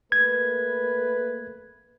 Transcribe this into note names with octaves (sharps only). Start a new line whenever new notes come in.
A3 A#3 B4 G#6